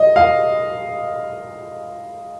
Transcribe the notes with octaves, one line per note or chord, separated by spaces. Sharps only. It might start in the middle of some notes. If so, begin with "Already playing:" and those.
Already playing: D#5
F5